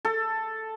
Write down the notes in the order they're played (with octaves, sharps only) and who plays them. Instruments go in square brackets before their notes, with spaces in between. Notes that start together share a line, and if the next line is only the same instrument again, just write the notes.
[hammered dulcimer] A4